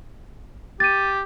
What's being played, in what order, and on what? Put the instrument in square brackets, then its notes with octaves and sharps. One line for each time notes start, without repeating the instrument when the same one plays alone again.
[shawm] G4 [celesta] A6 D#7